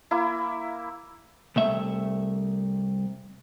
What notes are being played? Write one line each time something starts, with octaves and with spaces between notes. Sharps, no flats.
A#3 E4
C2 A3 E5